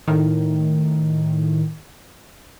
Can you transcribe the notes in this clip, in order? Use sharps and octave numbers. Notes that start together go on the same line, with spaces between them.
A2 D#3